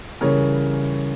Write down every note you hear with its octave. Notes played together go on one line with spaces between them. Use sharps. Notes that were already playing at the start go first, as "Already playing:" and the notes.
C#3 E3 G3 A#4 C#5